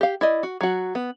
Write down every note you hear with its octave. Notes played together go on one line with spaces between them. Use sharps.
G4 F5
E4 D5 D#5
F#4
F#3 F#4
B3